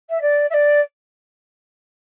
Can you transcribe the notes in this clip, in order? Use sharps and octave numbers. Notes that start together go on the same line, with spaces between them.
E5
D5
E5
D5